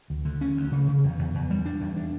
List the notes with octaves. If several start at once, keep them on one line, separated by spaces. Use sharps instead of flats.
D2
D3
C#4
D2
C#3
C#3
E2
E2
E2
G3
D4
E2
D4